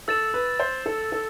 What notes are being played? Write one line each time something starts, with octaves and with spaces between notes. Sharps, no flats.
A4 E6 A6 E7
B4
C5
A4
A4